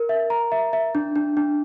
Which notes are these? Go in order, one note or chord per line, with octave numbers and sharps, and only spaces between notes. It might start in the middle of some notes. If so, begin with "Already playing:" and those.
Already playing: A#4
E5
A#5
E5
E5
D4
D4
D4